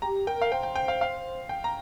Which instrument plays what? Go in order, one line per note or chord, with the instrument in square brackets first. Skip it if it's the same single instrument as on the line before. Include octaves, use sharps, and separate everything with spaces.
[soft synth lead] G4 [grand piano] A#5
[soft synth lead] A#4 [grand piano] G5
[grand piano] F5
[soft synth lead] C5 [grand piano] G5
[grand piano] G5
G5
F5
F5
G5
A#5